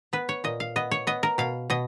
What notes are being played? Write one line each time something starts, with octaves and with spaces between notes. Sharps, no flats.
B3 B4
C#5
A#2 D#5
F5
B3 D#5
C#5
B3 D#5
A#4
B2 F5
B2 D#5